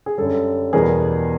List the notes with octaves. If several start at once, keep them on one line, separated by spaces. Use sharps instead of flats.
G#4
F#2 D3 G3 A4
E2 B2 G3 B3 G#4 A#4